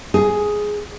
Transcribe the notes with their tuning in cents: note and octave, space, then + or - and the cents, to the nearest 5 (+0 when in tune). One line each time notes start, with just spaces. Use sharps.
G#4 +5